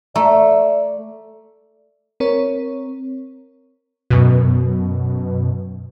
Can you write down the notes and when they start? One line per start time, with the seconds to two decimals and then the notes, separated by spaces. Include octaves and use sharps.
0.16 A3 D5 A#5
2.20 C4 A#4 C#5
4.11 F#2 B2